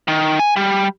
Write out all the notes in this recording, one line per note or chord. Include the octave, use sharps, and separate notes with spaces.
D#3
G#5
G3